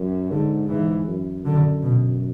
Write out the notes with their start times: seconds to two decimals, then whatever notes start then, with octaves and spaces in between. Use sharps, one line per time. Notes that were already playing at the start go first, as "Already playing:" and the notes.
Already playing: F#2
0.31 G#2 D3
0.69 G#2 E3
1.07 F#2
1.45 F#2 D3
1.82 B2